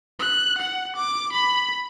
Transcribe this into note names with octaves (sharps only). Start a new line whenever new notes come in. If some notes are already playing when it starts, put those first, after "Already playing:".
F#6
F#5
D6
B5